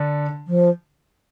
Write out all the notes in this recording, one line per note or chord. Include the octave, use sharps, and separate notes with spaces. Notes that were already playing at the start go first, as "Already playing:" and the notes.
Already playing: D3 D4
F3